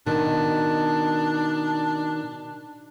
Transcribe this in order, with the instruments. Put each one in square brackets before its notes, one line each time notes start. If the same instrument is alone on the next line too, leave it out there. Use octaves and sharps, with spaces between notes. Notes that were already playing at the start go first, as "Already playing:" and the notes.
[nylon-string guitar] B2 D#3 [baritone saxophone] D4